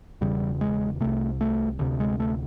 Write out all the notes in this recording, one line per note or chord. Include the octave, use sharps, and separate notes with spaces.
E1 E2 C#3 G3
G#3
C2 C3 A3
A3
D2 C3
G#3
A3